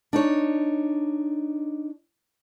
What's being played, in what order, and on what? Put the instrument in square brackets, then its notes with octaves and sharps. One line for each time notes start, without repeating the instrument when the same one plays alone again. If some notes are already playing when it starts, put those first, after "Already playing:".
[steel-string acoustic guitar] D4 D#4 C#5